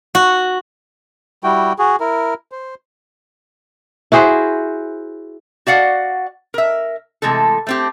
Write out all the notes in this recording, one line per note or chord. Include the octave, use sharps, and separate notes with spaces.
F#4
G3 E4 F#4 G5
F#4 G#4
E4 A#4
C5
E4 F#4 G#4 C5
F#4 D5 F5 F#5
A#4 E5
C3 E3 G#3 A3 A4
A3 C4 G4